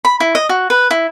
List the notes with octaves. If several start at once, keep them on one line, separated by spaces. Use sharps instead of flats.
B5
E4
D#5
F#4
B4
E4